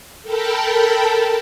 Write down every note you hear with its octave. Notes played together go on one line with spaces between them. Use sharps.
A4 A#4 G5 A5 B5